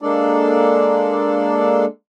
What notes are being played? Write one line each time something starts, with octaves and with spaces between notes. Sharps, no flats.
G#3 A#3 D4 A4 D5